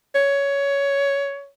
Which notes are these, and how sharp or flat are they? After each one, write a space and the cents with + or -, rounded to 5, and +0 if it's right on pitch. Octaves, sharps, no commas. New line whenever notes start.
C#5 +15